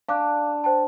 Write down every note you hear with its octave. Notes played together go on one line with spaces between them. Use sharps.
D4 F5 D6 F#6
C5 G5 A5